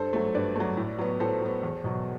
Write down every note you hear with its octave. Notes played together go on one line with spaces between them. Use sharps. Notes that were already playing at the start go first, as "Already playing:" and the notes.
Already playing: G2 A4 C5
F#3 A3
G2 B4 D5
F#3 A3
A2
F#3 B3
A2 A4 C5
F#3 B3
E2
B2 F#3